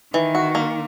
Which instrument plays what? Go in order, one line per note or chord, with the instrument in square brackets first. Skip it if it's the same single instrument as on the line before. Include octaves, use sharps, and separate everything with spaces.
[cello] D#3 [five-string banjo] E3
[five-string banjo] F#4
A#3